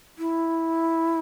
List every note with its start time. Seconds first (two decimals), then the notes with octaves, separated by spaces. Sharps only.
0.18 E4